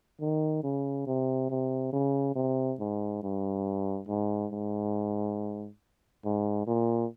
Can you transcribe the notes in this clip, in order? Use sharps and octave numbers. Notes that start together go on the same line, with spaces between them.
D#3
C#3
C3
C3
C#3
C3
G#2
G2
G#2
G#2
G#2
A#2